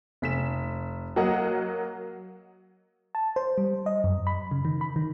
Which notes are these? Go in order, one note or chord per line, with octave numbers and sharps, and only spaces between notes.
F1 B6 E7
F#3 A#3 D#5 F#5
A5
C5
G3
D#5
F#2
B5
C#3
D#3
B5
D#3